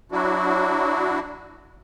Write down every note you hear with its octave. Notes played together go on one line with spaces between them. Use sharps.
F#3 D4 E4 F#4